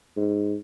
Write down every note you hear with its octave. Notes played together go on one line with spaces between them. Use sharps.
G#2